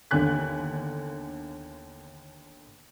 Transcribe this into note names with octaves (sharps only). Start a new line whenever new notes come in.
G1 D#2 D3 G#5 F#6 B6